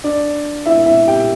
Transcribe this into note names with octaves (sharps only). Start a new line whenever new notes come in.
D4 D5
E4 E5
E4 E5
G4 G5